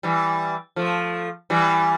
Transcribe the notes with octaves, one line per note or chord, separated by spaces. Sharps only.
E3 G3
F3 A3
E3 G3